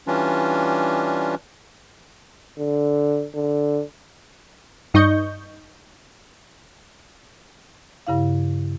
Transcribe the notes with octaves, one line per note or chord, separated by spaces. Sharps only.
E3 G3 C#4 D4 F4
D3
D3
G2 D#4 D#5 C#6 G6
G2 C#3 E4 F5